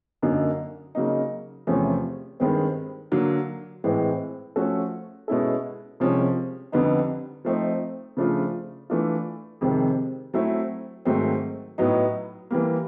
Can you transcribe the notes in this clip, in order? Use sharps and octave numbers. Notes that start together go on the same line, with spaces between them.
F#2 D3 F#3 A#3 D#4
C#3 F#3 A#3 D#4
E2 C3 F3 A3 C#4
G2 D#3 G#3 C4
D3 F#3 A#3
A2 E3 G#3 C4
F3 A3 C#4 F#4 A4
B2 G#3 C#4 E4 A4
C2 C3 F3 G#3 C#4
F2 D3 G3 B3 D#4
F3 A3 C4 D#4
C#3 F3 A3 D4 F4
E3 A3 D4 F4
F2 C3 D#3 G#3 C4
F#3 A3 C4 E4
G#2 D#3 F#3 A3 C4
A2 F#3 B3 D#4
E3 G3 A#3